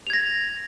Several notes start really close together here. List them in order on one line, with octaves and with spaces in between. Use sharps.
F7 G#6 A#6